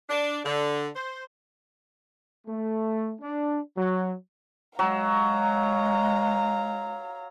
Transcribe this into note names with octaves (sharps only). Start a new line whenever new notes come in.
D4
D3
C5
A3
D4
F#3
F#3 G#3 F5 A#5